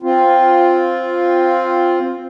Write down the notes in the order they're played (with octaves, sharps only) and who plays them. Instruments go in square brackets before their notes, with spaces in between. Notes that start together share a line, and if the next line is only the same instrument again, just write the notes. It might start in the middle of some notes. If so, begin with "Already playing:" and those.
[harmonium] C4 F4